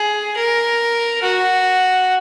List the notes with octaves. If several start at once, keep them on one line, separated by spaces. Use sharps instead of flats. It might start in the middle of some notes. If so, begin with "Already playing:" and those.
Already playing: G#4
A#4
F#4